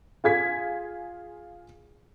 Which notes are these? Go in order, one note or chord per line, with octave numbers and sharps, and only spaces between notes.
F4 G#4 G#6 B6